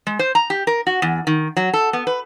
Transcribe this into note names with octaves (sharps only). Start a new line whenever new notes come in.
G#3
C5
A#5
G4
A#4
F#4
E2
D#3
F#3
A4
B3
B4